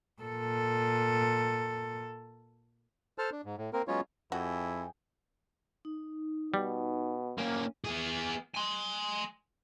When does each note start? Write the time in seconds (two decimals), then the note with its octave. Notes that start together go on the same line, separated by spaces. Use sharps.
0.22 A#2 A4
3.18 A4 C5 A5 F6
3.32 D4
3.45 G#2
3.58 A2
3.73 A#3 C4 A#4
3.88 F#3 G#3 B3 C#4 F4 C#5
4.32 F2 E4 F#4 G#4 G5
5.85 D#4
6.54 B2 G3
7.38 A#3 C#4
7.84 B3 G#4
8.55 G#5 C6